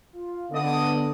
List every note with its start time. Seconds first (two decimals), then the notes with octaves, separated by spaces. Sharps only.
0.13 F4
0.51 D3 B3 D5 D#5 D#6